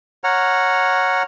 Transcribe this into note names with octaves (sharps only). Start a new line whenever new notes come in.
C#5 F#5 A#5 F6